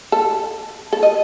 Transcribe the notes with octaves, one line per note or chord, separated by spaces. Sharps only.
A4
A4
D#5